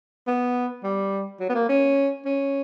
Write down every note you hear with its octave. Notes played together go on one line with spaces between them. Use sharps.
B3
G3
F#3
B3
A#3
C#4
C#4